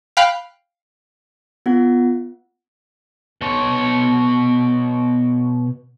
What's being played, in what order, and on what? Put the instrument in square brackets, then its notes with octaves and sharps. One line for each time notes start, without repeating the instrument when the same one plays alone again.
[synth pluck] F5 G5 B5 F#6
[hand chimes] B3 F4 F#5
[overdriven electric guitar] B2 C#5